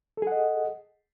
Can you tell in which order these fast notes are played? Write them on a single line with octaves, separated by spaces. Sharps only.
A4 G#4 F#5 D#5